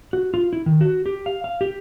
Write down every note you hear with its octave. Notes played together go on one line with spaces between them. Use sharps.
F#4
F4
E4
D#3
F#4
G4
F5
F5
G4